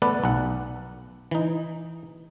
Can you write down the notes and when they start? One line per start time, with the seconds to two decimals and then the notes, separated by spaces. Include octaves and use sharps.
0.02 A3 B3 A4 B4 D5
0.24 B1 F#5
1.31 E3 D#4